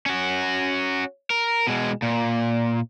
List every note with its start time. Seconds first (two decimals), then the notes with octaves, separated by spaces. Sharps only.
0.06 C#4 F#4
1.30 A#4
1.67 B2 G#3
2.02 A#2